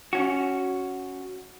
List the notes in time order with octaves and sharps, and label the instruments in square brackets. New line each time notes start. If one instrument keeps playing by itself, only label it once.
[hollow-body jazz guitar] C#4 F#4